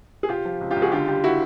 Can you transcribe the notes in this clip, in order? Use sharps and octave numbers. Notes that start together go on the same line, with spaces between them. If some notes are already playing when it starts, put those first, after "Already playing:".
G#4
C3 F4 G4
F3
C#2
F4 G4
C#2
F#4 G#4
D3 F4 G4
G3 F4 G4
E4 F#4